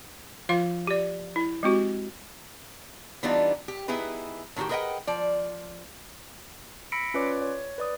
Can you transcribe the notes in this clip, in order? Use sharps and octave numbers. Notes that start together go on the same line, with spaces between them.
F3 F4 F5 C6
G4 D5
E4
G#3 C4 F#4 G4
E3 G3 B3 D4 D#4 F4
G4
B3 D#4 E4 G#4 B4
A2 D#3 F3 F#4 G4
G#4 A#4 B4 D#5 F#5 G5
F3 D5
B5 E6 A#6 B6 C#7 D7
C#4 F4 B4 C#5 D5 D6
C#5
B4 D5 D#6